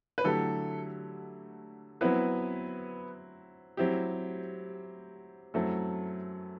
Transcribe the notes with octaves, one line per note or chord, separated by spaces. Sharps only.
B4
D3 F#3 A3 E4 G4 A4
F#3 B3 C4 E4 B4
F#3 C4 E4 G4
F#2 F#3 A3 C4 E4 A4